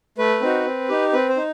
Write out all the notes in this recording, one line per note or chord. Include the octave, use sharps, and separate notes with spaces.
A3 B4
C4 D#4 F#4
C4
D#4 G4
C4 B4
C5
D#4